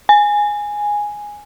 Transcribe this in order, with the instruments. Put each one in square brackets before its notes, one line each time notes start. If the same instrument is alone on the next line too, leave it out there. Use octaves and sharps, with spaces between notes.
[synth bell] G#5